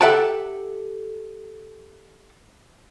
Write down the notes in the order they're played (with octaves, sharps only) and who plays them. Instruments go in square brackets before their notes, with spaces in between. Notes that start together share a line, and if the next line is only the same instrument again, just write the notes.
[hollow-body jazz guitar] G4 A4 E5 F#5 G5 A5